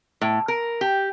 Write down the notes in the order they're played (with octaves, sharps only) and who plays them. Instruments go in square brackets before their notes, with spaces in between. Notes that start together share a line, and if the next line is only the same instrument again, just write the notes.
[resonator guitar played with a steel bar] A2
A#4
G4